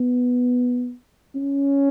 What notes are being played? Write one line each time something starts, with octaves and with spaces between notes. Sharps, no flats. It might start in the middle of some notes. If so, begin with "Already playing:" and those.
Already playing: B3
C#4